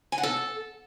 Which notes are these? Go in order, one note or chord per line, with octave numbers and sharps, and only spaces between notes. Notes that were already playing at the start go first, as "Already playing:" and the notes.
G#5
F#5
A4